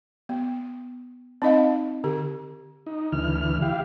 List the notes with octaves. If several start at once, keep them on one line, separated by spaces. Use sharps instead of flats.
B3
C4 D#4 D#5 F5
D3 G4
D#4
D2 E3 F6
E4 G4 F5